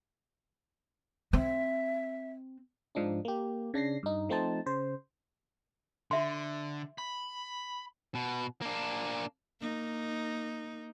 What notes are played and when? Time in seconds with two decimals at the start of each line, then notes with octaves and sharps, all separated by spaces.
1.33 C4 E5
2.95 G#2 F3 D4 D#4
3.25 A#3 G4
3.74 C#3 D4 A#6 C7
4.03 G2 D#4
4.29 F3 A3 C4 D#4 C5 A5
4.66 C#3 C5
6.11 D3 F#4 E5 C6
6.98 B5
8.15 B2
8.62 A#3 D4
9.60 A#3 D#4